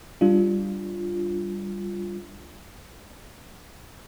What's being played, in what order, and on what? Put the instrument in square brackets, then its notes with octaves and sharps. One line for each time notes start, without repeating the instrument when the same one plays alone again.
[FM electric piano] G3 D4 F4